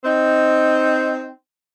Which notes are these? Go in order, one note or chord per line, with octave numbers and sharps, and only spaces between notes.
C4 D#4